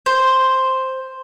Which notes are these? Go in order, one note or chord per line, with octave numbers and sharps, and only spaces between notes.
C5